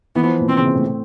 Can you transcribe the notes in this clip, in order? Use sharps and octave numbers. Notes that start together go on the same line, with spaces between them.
E3 B3
F3
A#2
B2 C4
C#3
C3
A2